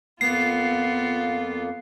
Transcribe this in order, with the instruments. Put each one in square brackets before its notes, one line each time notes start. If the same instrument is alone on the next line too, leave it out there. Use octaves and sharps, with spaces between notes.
[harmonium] F2 A#3 [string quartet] B3 F4 [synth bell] C7